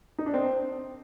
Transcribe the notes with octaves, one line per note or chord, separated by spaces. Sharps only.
D#4
D4
C4